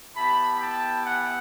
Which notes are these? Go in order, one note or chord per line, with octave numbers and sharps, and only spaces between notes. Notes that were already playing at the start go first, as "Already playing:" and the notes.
B3 E4 G4 A5 B5
G5 A5
F#5 G#5